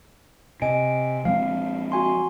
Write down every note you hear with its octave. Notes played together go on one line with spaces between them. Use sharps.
C3 D#5 G#5 D7
F3 G#3 C4 F5
F#4 G#5 C6